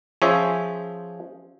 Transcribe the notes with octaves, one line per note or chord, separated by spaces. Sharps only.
F3 C#4 G#4 C5 C#5 E5